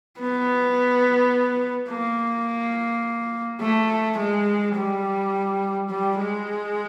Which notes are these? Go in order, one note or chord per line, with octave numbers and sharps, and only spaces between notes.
B3
A#3
A3
G#3
G3
G3
G#3